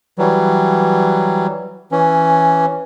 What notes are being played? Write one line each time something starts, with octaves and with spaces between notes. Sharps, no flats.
E3 F#3 G3
E3 C#4